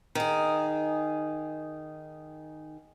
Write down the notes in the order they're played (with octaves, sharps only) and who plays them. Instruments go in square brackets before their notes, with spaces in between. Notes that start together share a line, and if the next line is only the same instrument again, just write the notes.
[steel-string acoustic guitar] D#3 G#4